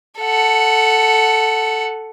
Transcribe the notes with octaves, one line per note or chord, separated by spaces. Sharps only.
A4 F#5